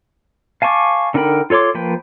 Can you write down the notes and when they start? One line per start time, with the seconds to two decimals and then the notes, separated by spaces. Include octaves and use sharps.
0.62 F5 G#5 A5 C#6 D6
1.14 D3 D#4 A#4 G5 B5
1.50 F4 A4 C#5 C6 D6
1.74 F3 A#3 B4 G5